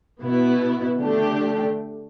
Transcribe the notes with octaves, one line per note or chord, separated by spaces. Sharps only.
B2 B3 E4
D3 A3 D4 G4